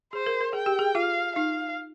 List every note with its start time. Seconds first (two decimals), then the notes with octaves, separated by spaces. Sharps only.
0.13 G#4 C5
0.26 A#4
0.41 A#4
0.53 G#4 G5
0.66 G4
0.79 G#4
0.95 F4 F5
1.35 D#4 F5